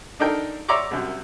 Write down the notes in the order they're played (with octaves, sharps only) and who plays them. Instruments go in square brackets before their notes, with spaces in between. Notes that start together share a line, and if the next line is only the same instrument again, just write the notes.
[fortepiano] D4 D#4 A4 A#4 G5
C#5 D5 E5 A#5 C6 D6
C2 F#2